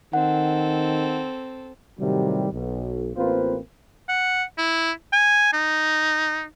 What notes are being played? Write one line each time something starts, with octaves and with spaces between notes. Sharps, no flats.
D#3 C4 A4 F#5
A2 C3 D#3 F#3 G3
B1
A1 A#3 C4 F4 B4 C5
F#5
E4
G#5
D#4